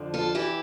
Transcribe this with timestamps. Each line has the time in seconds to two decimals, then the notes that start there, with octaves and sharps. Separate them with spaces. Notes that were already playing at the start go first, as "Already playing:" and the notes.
Already playing: F2 D3 F3
0.14 F4 A4
0.35 E3 E4 G4